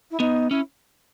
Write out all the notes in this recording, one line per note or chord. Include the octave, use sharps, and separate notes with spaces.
E4
B3 D#4
C#4 E4